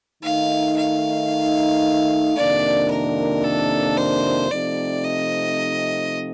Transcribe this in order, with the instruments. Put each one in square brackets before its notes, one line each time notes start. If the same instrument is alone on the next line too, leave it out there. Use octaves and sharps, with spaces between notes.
[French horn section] D#3 A3 D#4 [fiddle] F5
[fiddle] F5
[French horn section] F2 C3 D#3 A#3 D4 [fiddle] D5
[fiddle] A#4
A4
C5
[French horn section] C3 F3 A3 C4 D#4 [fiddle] D5
[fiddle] D#5